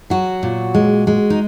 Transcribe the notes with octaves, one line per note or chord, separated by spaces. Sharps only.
F#3 F#4
A#2
G#3
G#3
D#4